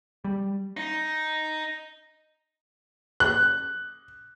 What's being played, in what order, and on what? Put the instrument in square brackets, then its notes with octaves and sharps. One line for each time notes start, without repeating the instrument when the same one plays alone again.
[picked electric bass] G3
[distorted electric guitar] D#4
[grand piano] F#6